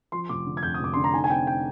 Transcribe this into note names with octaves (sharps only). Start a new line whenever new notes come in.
F3 C6
F1 D6
D3
G#6
F2 G6
D#6
F1 D6
D3 C6
A#5
D#4 G#5
G#5
C4 G5
G5